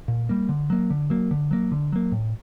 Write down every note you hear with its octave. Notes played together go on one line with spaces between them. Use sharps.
A#2
G3 A#3
D3
F#3 A#3
D3
F#3 A#3
D3
F#3 A#3
D3
F#3 A#3
A2